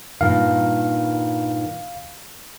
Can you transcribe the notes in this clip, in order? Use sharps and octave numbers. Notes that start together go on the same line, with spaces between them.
G2 A#2 D#3 F5